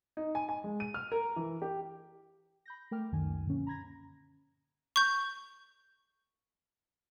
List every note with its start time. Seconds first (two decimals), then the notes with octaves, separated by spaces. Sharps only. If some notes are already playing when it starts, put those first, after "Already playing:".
0.17 D#4
0.35 G#5
0.49 G#5
0.64 G#3
0.80 D#7
0.94 F6
1.12 A#4
1.36 E3
1.62 G4
2.66 B5 G6 A#6
2.91 A3 A#4 G5 D6 F6
3.12 C#2 F#2 D#3 G#5
3.46 G2 A#2 D3 F3 A#3 C#4
3.67 A#5 B5 G#6 A#6
4.96 C#6 G6